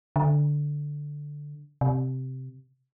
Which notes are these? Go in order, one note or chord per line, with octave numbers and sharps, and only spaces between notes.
D3
C3